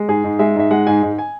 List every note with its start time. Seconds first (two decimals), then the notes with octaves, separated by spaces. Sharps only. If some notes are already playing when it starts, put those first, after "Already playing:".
Already playing: G#3
0.08 G#2 G#4
0.24 G#2
0.39 G#3 E5
0.56 G#2 E5
0.71 G#3 F#5
0.87 G#2 G#5
1.03 G#2
1.18 G#5